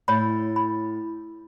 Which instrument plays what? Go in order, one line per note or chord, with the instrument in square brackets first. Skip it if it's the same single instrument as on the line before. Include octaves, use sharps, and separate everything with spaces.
[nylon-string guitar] A2 [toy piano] C#5 B5
[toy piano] B5